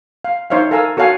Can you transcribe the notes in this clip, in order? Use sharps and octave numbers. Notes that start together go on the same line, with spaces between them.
F5
D#4 C5 C#5 E5 F5
A4 A#4 F5 G#5 A#5 E6
F#4 A4 C#5 F5 F#5 G#5